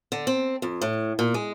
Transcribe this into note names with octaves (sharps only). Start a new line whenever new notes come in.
D3
C4
F2
A2
A#2
G#3